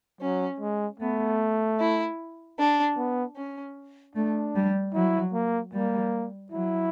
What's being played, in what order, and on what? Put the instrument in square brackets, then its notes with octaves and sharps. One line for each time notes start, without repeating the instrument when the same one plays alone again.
[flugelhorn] F#3 [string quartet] C#4
[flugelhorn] G#3
[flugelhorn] A3 [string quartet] B3
[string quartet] E4
D4
[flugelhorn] B3
[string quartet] C#4
[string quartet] A3 [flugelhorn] D4
[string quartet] G3
[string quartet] F#3 [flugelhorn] E4
[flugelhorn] A#3
[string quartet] G3 [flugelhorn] A#3
[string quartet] F#3 [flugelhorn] E4